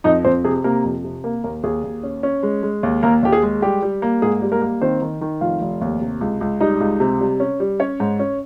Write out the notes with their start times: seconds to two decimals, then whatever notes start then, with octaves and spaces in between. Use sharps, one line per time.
0.04 F2 D#4 D#5
0.25 F2 C4 C5
0.44 C3 G#4
0.64 C3 A#3 A#4
0.84 F2
1.04 C3
1.24 A#3 A#4
1.44 D#2 A#3 A#4
1.63 D#2 G#4
1.84 D#2
2.03 C#4
2.23 C#4
2.43 G#3
2.63 G#3
2.83 D#2
3.03 D#2 A#3 A#4
3.23 D#2 G4
3.32 G#4
3.43 G#3
3.62 G3 G4
3.82 G3
4.02 A#3
4.22 G#2 G#4
4.42 G3
4.52 A#3 A#4
4.62 A#3
4.81 D#3 C4 C5
5.02 D#3
5.21 D#3
5.41 F1 F4 F5
5.61 F1
5.81 D#2
6.01 C3
6.21 C#2
6.41 C#2
6.61 G3 D#4 D#5
6.80 C#2
7.00 C3
7.20 G3
7.40 C#4
7.60 G3
7.80 C#4 C#5
8.00 G#2
8.19 C#4